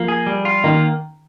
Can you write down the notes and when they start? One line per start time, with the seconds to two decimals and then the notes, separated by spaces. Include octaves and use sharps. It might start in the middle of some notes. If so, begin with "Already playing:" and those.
Already playing: F3 A#3
0.08 G#4
0.27 G3
0.45 F4
0.64 D#3 A#3